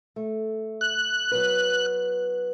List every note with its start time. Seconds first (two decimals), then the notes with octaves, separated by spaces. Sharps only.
0.16 A3
0.81 F#6
1.31 F#3 B3 B4